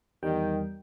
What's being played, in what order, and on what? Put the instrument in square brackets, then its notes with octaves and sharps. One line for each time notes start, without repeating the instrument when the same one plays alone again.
[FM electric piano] E2 G3 G5 [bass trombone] D#3